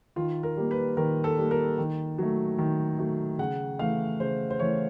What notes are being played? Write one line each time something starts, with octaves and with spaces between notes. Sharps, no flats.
D#3 F4
A#4
G3 A#3
B4
D#3 A#4
A4
G3 A#3
A#4
D#3
F#3 A3
D#3
F#3 A3
C#3 F#5
E3 A3 F5
C#3 C5
C5
E3 A3 C#5